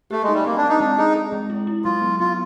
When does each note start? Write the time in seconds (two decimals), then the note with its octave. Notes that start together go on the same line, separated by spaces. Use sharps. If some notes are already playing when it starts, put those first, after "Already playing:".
0.11 A3 G4
0.23 G#3 D#4
0.34 G3
0.45 A#3 C4
0.57 D4
0.64 C4
0.69 D#4
0.80 G#3 D4
0.98 D#4 G#4
1.15 G#4
1.32 G#3
1.50 E4
1.67 E4
1.84 F#3 F4
2.02 B3
2.20 B3 F4